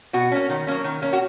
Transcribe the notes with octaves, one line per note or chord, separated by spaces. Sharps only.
B2 F#4
A#3 C#4
D#3
F#3 A#3 C#4
D#3
A#3 C#4
F#4